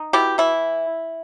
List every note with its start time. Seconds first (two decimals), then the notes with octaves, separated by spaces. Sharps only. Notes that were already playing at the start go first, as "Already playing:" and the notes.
Already playing: D#4
0.13 B2 E4 G4
0.38 E3 E4